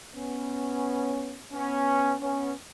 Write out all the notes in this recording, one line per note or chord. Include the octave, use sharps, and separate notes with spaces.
B3 C#4
B3 C#4
B3 C#4